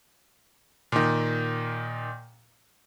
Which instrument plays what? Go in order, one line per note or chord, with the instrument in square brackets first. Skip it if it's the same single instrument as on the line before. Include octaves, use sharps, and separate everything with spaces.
[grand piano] A#2 D#3